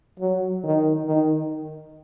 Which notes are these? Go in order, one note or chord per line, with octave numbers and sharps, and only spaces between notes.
F#3
D#3
D#3